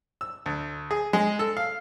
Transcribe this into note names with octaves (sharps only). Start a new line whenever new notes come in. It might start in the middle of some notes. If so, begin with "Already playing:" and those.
E6
D2
G#4
G#3
A4
F5